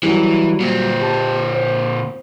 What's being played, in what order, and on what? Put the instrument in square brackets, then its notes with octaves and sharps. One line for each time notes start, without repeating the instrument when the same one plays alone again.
[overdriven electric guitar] E3 [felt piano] F#3 G3
[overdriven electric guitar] A#2 C4
[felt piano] G4 A5
C5